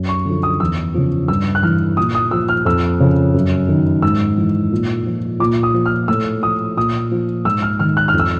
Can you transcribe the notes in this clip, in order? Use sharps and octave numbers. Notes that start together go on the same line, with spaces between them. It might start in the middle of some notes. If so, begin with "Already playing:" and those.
Already playing: F#2
C#6
D3 F3
D#6
E2 E6
C#3 F3
G2 E6
F#6
E3 F6
A#2 D#6
D#6
F3 E6
F6
F2 E6
C#3 F3
F#2
D#3
G#2 E6
E3
A#2
F3
A#2 D6
D#6
F3
F6
A2 E6
F3 D#6
A#2 D#6
F3
G#2 E6
F6
D#3 F6
F#6
F6
F2
E6